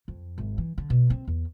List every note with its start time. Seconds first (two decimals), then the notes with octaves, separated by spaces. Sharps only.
0.08 F2
0.38 G#1
0.58 E3
0.78 D3
0.90 B2
1.10 C4
1.28 E2